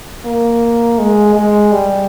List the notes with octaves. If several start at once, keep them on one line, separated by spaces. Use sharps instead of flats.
A#3
G#3
G#3
G3